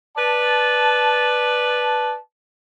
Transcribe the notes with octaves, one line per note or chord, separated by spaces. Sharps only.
B4 D5 A5